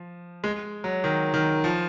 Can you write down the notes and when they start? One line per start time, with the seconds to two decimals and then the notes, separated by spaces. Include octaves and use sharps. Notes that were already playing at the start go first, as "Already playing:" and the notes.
Already playing: F3
0.44 G#3
0.84 F#3
1.04 D#3
1.34 D#3
1.64 F3